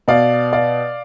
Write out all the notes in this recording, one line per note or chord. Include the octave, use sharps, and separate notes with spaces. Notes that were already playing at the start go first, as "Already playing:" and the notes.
B2 D5 F5
D5 F5